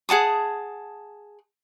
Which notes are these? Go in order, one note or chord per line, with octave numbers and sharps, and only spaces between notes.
G#4 F#5 A5 D#6